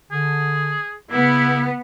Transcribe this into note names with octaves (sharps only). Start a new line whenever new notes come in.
D3 G#4
C#3 B3 E4